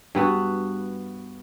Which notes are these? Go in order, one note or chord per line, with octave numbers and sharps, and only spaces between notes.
G2 B3 F#4